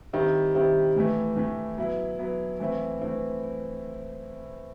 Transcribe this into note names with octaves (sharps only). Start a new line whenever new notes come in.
D#3 G3 C4 E4
D#3 G3 C4 E4
A2 E3 A3
A2 E3 A3
F#3 B3 E4
F#3 B3 E4
E3 A3 C4 E4
E3 A3 C4 E4